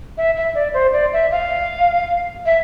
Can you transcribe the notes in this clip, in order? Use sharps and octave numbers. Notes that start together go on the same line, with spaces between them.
E5
E5
D5
C5
D5
E5
F5
E5